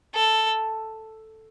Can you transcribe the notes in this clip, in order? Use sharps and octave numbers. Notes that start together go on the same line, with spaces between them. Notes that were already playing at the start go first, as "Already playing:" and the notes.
A4